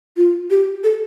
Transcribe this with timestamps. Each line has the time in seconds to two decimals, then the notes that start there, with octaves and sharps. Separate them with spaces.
0.17 F4
0.50 G4
0.84 A4